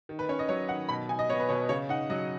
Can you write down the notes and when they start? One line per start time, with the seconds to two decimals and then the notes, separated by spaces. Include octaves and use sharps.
0.09 D#3
0.19 B4
0.29 C#4 C#5
0.39 D#5
0.49 F#3 C#5
0.69 D#3 F#5
0.89 B2 B5
1.09 D#4 G#5
1.19 D#5
1.30 B3 C#5
1.39 B4
1.49 B2 C#5
1.69 C#3 C#5
1.89 D#4 F#5
2.10 F#3 D#5